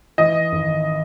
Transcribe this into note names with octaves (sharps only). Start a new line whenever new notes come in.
E3 D#5
G#1